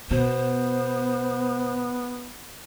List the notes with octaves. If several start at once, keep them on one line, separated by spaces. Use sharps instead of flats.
B2 B3 C5